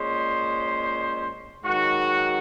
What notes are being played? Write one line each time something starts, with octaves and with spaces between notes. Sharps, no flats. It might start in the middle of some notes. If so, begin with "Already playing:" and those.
Already playing: A#2 G#3 C#4 C5
G#2 D#3 F#3 F#4